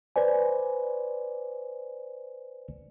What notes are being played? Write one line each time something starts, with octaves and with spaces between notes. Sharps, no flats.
B4 C5 D5 G#5